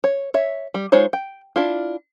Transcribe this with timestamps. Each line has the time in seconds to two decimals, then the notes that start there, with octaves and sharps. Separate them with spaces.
0.04 C#5
0.34 C#5 E5
0.74 G3
0.92 G#3 D#4 F4 C5 C#5
1.13 G5
1.56 D4 E4 F4